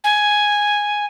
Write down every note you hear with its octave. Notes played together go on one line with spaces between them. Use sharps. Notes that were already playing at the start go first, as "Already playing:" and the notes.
G#5